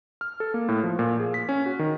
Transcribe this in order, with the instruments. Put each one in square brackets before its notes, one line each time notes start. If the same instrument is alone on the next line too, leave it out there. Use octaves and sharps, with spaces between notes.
[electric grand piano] F6
A4
A#3
A2
F3
A#2
G#4
B6
C#4
F#4
D#3